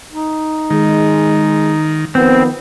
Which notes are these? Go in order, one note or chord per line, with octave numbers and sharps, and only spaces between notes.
D#4
D#3 G#3
D#3 F3 B3 C4